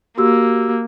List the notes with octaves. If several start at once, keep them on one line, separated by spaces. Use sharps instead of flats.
A#3 F#4 G4 E6